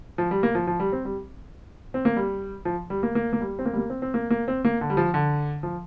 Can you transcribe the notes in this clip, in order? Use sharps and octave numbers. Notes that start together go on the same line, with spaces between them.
F3
G3
A#3
F3
F3
G3
C4
G3
C4
A#3
G3
F3
G3
A#3
A#3
A#3
G3
C4
A#3
G3
A#3
C4
C4
A#3
A#3
C4
A#3
D3
G3
F3
D3
F3